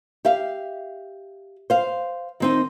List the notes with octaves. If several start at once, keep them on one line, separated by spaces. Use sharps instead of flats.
G4 E5 F5
C5 F5
D#3 C4 D#4